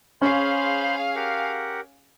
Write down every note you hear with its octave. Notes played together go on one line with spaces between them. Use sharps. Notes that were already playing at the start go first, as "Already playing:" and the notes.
C#4 G#4 C5 F5 B5 C6
G4 A#4 F#5